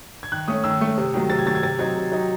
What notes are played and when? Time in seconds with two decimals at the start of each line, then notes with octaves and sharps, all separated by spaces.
0.23 G#6
0.32 D#3 F#6
0.48 A3 C#4 D#6
0.64 D#3 E6
0.81 A3 C#4
0.98 C3
1.14 D#3 F#3 A3
1.30 C3 A6
1.39 G#6
1.46 D#3 F#3 A3 A6
1.55 G#6
1.63 C3 A6
1.79 F#3 C4 D#4 G#6
1.96 C3
2.12 F#3 C4 D#4